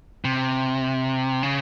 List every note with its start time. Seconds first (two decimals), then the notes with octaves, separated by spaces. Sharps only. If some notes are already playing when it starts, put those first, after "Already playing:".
0.25 C3
1.43 C#3